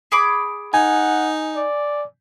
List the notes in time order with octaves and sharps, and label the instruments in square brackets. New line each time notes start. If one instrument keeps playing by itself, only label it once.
[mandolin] G#4 B5 D6
[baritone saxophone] D#4 [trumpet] F#5 [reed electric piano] G#5
[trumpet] D5